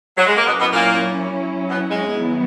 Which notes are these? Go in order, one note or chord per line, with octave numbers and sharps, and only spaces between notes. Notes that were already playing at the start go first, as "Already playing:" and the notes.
F#3
G#3
A#3
B2 F#3 B3 C#4 E4
B2 B3
A#2 A#3
B2 B3
G#2 G#3
D#3 F#3 B3 E4